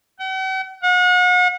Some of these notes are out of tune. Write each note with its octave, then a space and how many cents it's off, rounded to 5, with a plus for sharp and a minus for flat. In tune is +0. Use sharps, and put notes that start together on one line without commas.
F#5 +45
F#5 -40